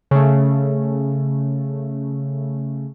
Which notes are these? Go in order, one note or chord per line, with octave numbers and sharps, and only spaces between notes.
C#3 A3